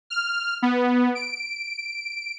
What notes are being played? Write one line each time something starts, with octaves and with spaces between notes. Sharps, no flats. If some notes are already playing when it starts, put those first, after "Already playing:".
F6
B3
D7